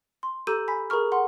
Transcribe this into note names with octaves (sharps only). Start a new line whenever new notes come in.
C6
G4 A4 A#5 E6 G6 D#7
G#5 B5 B6
G#4 A#4 A#5 C#6 F6
F#5 C6